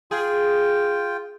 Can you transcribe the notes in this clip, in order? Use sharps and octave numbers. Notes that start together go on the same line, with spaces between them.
F4 G#4 G5